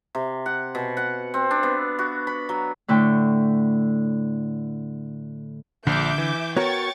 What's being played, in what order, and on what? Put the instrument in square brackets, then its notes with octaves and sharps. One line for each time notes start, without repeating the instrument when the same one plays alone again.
[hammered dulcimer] C3
F#5
B2
F#5
C4
D4
B3
F#4
B5
F#3
[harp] A2 D3 E4 G5 C#6
[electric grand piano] A#1 [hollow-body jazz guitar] D3 [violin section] E5 D6 G6
[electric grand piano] E3
[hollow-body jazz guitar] B3 F#4 A#4 [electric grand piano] C#5 [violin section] G5 C#6 A6